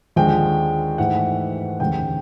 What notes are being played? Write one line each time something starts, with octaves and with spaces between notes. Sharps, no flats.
D#2 D3 F3 G#3 G5
G#2 E3 A3 F#5
F1 D#2 C#3 G5